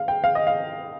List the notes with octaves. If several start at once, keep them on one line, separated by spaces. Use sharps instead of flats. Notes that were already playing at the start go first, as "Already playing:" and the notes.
Already playing: F5
G5
F5
D#5
F5